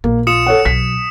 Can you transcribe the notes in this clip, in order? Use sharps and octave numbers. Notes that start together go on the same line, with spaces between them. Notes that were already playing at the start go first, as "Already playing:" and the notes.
A#1 A#3
F4 D#6 C#7 E7
A4 C#5 F#5
B1 B6